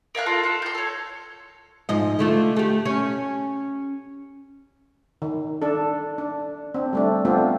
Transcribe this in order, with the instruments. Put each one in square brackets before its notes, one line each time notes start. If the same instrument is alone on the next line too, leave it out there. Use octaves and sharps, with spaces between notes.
[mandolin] A#4 E5 F5 F#6
F4 A4 A#4
F4 A4
C6 G6
A4 C#5
[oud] G#2 F3 D#5
D3 A3 F4
A3 G4
C#4
[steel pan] D#3
D4 A4
D4
C4 D4
G3 A3 D4
A3 B3 C4 D4 F4